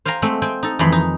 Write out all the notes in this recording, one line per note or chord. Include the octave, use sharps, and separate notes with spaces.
C5 F5 G5 G#5 A#5 C6
G#3 A3 C4
C4 G5 G#5
D#4 A4
F2 D#3 E3 G#3 B5 C6
D#4